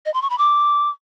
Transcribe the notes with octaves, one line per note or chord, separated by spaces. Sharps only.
D#5
C6
C#6
B5
D6